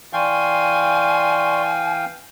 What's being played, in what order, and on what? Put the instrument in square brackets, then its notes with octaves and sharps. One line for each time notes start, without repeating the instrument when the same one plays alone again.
[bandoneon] E3 F5 G5 [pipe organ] D5 C6 C#6 [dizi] G#5